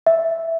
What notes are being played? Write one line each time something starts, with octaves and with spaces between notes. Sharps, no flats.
E5